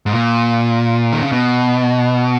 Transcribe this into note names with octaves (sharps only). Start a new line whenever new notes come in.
G#2
A#2
D#3
C#3
B2